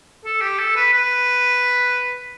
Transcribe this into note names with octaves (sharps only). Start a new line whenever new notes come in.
A4
G4
A4
B4
B4